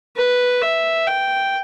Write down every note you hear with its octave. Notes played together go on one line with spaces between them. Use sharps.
B4
E5
G5